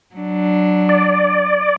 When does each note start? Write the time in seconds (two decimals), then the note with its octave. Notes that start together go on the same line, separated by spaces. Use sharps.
0.15 F#3 D4
0.89 D5